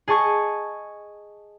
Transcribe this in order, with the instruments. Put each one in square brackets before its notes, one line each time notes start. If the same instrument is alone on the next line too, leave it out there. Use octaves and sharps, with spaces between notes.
[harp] G#4 D#5 A5 C#6 G#6